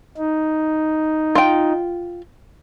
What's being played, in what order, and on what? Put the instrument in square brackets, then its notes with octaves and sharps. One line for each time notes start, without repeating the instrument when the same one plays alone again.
[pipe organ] D#4
[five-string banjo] F4 G5